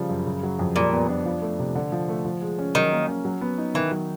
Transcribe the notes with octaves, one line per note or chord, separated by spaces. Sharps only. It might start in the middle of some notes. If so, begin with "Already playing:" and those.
Already playing: C#3 F3 G3
F#2
C#3
F#3
F2
A#2 G3
B3
D4
F3
A3
C3
D3
F3
A3
F3
G#3
C#4
D#3 F#3
A#3
C#4
F#3
B3
D#4
D#3 E3
F#3